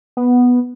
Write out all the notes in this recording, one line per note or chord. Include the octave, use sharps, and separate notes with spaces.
B3